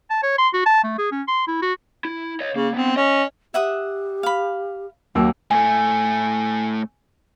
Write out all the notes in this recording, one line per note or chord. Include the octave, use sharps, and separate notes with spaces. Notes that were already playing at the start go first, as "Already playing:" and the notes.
A5
C#5
C6
F#4
A5
A3
G#4
C#4
C6
E4
F#4
E4
C#5 D#5
C#3 A#3
B3 C4 D4
C#4 D#5
G4 E5 F#5 D#6
F5 B5
D#2 F#3 A#3 E6
A2 A3 G#5